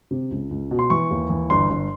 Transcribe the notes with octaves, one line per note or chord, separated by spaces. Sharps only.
C3
C#2
C#2
B2
C6
E3 C#6
D#2
E3
G1 C6
G1